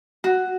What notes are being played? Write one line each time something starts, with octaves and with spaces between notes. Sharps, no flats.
F#4